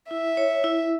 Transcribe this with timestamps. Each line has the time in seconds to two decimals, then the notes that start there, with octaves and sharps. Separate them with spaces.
0.10 E4 E5
0.37 C#5
0.64 E4